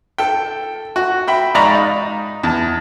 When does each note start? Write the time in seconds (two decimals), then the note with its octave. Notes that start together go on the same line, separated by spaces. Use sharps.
0.18 A4 G5
0.96 F#4
1.28 E5 G5 B5
1.55 G#2 D5 F5 A#5 B5 C#6
1.75 D#4
2.44 E2 A5